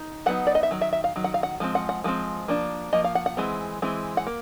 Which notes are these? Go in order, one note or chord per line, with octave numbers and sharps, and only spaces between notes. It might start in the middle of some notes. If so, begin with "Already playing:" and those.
Already playing: D#4
F#3 B3 D#4 F#5
D5
D#5
E5
D#3 F#3
E5
E5
F5
D#3 F#3
F#5
F5
F#5
F3 G#3 C4
F#5
F#5
F3 G#3 C4
F3 A#3 D4
F3 A#3 D#5
F5
F#5
F#5
E3 G#3 C4
E3 G#3 C4
F#5
A#3